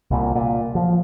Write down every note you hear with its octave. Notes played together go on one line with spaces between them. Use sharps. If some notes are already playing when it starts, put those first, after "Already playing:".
C2 A#2
A#2
F3